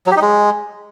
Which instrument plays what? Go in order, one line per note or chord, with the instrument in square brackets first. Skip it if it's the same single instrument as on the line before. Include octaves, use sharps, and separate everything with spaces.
[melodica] F#3
G4
D#4
G#3